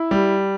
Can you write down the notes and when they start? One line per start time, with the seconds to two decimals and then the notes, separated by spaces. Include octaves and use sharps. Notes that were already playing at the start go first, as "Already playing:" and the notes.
Already playing: E4
0.11 G3